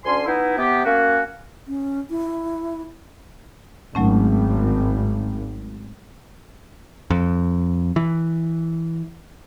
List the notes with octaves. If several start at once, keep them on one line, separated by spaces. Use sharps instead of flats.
D2 D3 C#4 G#5 C6
E3 B3 D#4 E4
C3 B3 G4
A#3 C#4 F#4
C#4
E4
G#1 F#3 A3 C#4
F2
E3